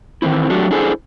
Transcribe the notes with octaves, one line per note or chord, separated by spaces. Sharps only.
D#3 E3 C4 E4
F#3 A3 D4 F#4 G4
D4 E4 G#4 A4 B4 C5